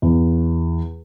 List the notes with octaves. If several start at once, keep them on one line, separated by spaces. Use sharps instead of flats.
E2